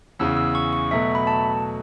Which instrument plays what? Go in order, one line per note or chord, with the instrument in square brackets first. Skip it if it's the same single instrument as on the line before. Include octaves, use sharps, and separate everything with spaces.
[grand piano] E2 C#3 E3 [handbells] E6
[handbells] E6
C#6
C#6
[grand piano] B2 F#3 A3 [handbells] E5
[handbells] B5
A5